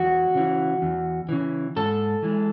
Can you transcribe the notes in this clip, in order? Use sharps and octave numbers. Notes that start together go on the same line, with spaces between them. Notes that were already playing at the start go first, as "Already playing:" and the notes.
Already playing: E2 F#4
C#3 E3
E2
C#3 E3
G#2 A4
E3 G#3